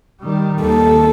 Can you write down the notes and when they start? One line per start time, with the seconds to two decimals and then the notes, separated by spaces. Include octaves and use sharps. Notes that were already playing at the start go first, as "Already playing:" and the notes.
0.21 D#3 G3
0.62 D#2 A4